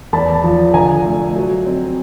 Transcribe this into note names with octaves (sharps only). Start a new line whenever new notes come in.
E2 A5 B5
F3
D3 G#5 A#5
A3
F#3
C4